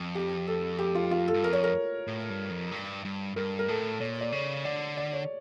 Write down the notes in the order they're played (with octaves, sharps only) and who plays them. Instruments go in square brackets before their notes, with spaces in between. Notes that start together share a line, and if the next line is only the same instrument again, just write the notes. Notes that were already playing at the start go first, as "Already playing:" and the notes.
Already playing: [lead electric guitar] F2
[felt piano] G4
A4
G4
F4
F4
A4
[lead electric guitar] G2
[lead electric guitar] F2 [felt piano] A#4
[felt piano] C#5
A#4
[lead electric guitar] A2
G2
F2
G2
G2
[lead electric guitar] G2 [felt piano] A#4
[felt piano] A#4
[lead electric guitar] A2 [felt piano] A4
[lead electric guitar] A#2 [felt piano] C#5
[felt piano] D5
[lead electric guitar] C#3 [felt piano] C#5
[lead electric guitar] D3 [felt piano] D5
[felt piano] D5
C#5